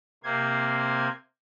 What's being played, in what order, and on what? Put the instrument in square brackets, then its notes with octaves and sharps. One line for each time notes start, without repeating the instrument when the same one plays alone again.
[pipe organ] C3 A#3 C5 G#6